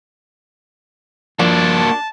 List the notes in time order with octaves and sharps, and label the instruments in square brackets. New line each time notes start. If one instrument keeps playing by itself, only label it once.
[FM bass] F3 [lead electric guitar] A#3 F#4 [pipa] D4 [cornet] A5